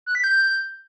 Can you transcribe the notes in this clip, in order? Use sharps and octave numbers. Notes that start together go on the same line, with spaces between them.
F#6
B6
G6